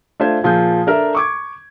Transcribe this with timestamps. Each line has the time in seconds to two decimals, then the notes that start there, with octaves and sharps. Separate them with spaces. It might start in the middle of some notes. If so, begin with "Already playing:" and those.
0.20 A3 D4 F4 C5 F5 G#6
0.43 A#2 F3 F4 G#4 G6
0.87 D4 A4 A#4 E5
1.15 C#6 D6 G#6